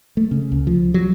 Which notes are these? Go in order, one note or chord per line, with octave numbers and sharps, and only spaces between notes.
A3
C#3
C#2
F3
F#3